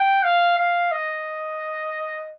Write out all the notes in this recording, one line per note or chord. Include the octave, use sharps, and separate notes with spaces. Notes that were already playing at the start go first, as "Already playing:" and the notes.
Already playing: G5
F5
F5
D#5